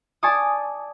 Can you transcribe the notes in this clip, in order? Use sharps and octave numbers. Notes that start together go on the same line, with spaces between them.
D5 G#5 A5 C#6 D#6